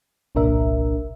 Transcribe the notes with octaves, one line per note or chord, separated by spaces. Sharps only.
G1 C2 A#2 D4 A#4 E5